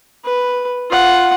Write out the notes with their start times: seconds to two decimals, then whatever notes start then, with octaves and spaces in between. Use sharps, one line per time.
0.25 B4
0.90 F4 F#5